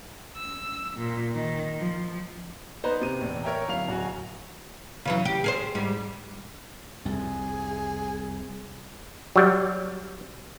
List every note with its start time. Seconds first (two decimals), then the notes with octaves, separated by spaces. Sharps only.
0.37 E6
0.97 A#2
1.36 D#3
1.78 F3
2.84 B3 D#4 B4 C5 A#5
3.01 C3 D#7
3.21 E2 A2
3.43 A#4 C#5 E5 G5 A#5
3.69 D1 E4 F5 F7
3.88 D1 F#4 G#5
5.05 C#3 E3 F#3
5.25 G4
5.44 G#4 A#4 C5
5.75 G#2 G3
7.05 C2 F2 G#4
9.36 F#3 G3